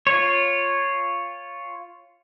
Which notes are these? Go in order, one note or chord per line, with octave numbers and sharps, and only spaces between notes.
F4 C#5